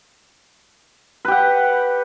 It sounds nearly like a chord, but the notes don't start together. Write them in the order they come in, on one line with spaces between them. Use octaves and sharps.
B4 G4 F#5